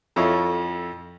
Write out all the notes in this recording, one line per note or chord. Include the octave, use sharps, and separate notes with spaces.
F2 E4 F4 A4 C#5 D#5